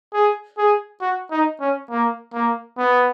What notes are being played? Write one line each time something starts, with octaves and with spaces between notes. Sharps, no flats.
G#4
G#4
F#4
D#4
C#4
A#3
A#3
B3